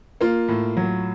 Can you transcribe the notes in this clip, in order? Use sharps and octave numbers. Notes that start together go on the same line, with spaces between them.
A#3 F4
A2
F#3